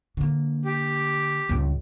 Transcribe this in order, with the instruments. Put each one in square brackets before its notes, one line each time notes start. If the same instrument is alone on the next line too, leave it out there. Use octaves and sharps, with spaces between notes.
[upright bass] D3 A#3
[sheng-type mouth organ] G4
[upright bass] C#2 G2